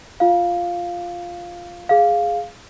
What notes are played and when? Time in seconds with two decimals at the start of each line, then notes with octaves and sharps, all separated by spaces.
0.20 F4 F5
1.89 G#4 F5